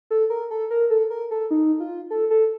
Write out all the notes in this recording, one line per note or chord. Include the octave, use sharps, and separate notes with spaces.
A4
A#4
A4
A#4
A4
A#4
A4
D#4
F4
A4
A4